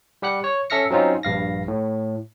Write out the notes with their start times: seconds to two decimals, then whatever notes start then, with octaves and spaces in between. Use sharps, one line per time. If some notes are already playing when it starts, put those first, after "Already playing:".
0.22 G3 G4 F#5 F#6
0.44 C#5
0.70 C#4 A4 E5 F6 A#6 C#7
0.90 F#3 C4 C#4 D#4 F4
1.23 A#1 G2 F5 A#6
1.68 A2